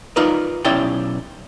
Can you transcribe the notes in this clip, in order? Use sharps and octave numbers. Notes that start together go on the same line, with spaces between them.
D#4 F4 A#4 B4 D5
B1 C#4 E4 G4 D5 G5